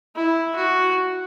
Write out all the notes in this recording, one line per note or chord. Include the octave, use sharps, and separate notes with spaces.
E4
F#4